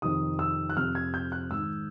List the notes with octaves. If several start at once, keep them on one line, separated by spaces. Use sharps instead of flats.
F2 C3 D#3 D#6
E6
F#6
F2 C3 F3 F6
G#6
G6
F#6
G#2 D#3 E6